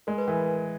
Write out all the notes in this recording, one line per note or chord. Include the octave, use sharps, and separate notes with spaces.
G#3 A#4
B4
E3 A#4